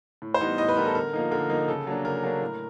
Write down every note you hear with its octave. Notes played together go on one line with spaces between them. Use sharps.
A2
C5
E3 G3 B3 D#4
A2 D#5
B4
E3 G3 B3 D#4 A#4
A4
D3 A#4
F3 A#3 D#4
D3 A#4
F3 A#3 D#4
C#3 A4
F#3 A#3 D4
C#3 A#4
F#3 A#3 D4
A2